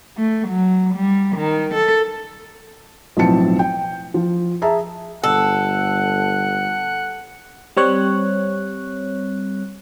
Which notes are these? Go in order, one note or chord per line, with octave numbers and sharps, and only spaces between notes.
A3
F#3
G3
D#3
A4
B1 A2 F3 C4 A5 C#7
G5
F3
G#4 E5 A5 A#5
G1 A4 F#5
G3 C4 C#5 F#6